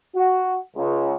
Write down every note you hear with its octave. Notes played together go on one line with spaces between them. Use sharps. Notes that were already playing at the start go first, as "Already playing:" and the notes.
F#4 F#5
C#2